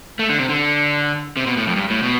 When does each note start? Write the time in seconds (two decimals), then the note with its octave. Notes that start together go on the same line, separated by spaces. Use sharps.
0.19 A3
0.29 D3
0.39 C3
0.49 D3
1.37 C3
1.47 B2
1.57 A2
1.67 F2
1.76 G2
1.90 A2
2.03 B2